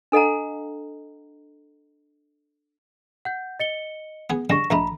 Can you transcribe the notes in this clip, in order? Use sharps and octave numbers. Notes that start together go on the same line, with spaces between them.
D4 A4 D#5 F#5 A#5
F#5 G6
D#5 C#7 G7
B3 G#4
D3 G3 G#3 C#6 A#6 E7
A#1 A3 D#5 A#5 B5